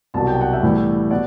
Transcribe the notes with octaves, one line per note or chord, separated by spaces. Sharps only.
C2 B2 F#3 A5
G5
F#5
E5 G5
A2 E3 G3 B3
B2 D5 F#5